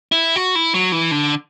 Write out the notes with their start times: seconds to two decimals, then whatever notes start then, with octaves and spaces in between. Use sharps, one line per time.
0.12 E4
0.36 F#4
0.55 E4
0.74 F#3
0.92 E3
1.11 D3